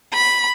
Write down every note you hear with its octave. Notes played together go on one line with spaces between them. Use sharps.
B5